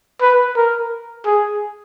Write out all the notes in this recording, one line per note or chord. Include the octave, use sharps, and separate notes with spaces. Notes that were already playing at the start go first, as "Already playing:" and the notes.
B4
A#4
G#4